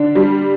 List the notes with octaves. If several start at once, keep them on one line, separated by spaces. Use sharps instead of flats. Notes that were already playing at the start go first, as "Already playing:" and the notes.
Already playing: D3 D4
G3